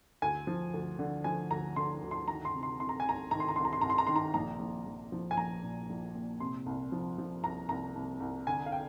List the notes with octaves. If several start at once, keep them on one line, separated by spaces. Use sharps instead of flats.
D2 G#5
F3
D2
D3
F3 G#5
D2 A#5
D3 C6
D2
C6
D#3 A#5
C6
C3
C6
C2 C6
A#5
G#5
C2 A#5
D#3 A#5
C6
A#5
C2 C6
A#5
C6
C2 A#5
C6
A#5
D#3 C6
A#5
A#1 A#5
A#1
A#1
F3
G#5
A#1 A#5
A#2
A#1
A#2
C3 C6
C2
F3
F3
C2 A#5
C2 A#5
C2
C2
D3 G#5
F5
G5